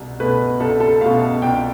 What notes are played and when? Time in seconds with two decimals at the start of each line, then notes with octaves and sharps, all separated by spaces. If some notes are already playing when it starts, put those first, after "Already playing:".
Already playing: C2 B2
0.20 B2 A3 B4
0.60 C2 A4
0.80 A4
1.01 B2 A3 F5
1.22 A5
1.42 C2 G5